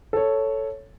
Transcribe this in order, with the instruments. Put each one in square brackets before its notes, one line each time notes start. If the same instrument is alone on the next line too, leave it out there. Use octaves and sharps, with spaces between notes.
[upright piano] A4 C#5